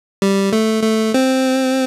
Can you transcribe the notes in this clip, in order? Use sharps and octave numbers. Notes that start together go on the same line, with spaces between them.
G3
A3
A3
C4